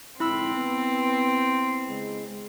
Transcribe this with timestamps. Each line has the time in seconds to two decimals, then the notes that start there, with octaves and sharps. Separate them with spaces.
0.20 F2 G#2 D3 C4 E4 B5 E6
0.54 B3
1.88 C#3 G#3